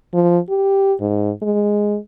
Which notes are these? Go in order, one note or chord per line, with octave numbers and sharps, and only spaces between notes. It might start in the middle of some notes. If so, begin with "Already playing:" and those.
F3
G4
G#2
G#3